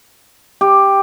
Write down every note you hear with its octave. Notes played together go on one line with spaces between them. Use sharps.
G4